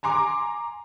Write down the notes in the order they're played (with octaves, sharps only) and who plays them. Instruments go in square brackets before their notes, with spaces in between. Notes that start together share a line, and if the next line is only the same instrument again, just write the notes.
[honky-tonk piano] G#5 A#5 C6 D6